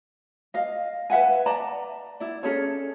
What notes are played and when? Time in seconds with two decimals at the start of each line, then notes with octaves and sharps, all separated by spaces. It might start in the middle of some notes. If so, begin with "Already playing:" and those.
0.54 D#5 F5
1.10 B4 E5 F#5 G#5
1.46 D5 A5 A#5
2.20 E4 D5
2.43 C#4 G#4 A4 C#5